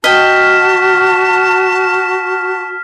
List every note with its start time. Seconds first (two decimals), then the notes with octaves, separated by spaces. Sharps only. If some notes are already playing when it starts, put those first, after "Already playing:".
0.04 F#4 D#5 G5 A5 F6 B6